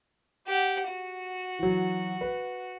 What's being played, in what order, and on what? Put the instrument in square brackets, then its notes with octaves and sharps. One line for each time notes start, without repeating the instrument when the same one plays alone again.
[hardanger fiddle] G4 F#5
F#4
[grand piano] E3 F#3
B4